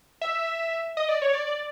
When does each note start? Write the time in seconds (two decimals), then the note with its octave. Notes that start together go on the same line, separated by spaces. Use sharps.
0.21 E5
0.97 D#5
1.09 D5
1.22 C#5
1.33 D5
1.47 D5